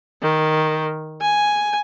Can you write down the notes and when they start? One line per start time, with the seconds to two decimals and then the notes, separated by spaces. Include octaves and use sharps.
0.22 D#3
1.22 G#5